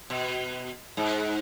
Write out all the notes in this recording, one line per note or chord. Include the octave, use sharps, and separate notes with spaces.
B2
G#2